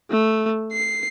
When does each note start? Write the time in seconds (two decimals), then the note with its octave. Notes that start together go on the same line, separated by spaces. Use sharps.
0.11 A3
0.72 C7